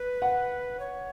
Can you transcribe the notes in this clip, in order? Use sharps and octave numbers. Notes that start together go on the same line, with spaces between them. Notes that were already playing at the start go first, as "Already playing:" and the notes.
Already playing: B4
F#5
C#5